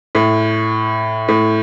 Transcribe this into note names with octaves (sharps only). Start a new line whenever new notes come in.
A2
A2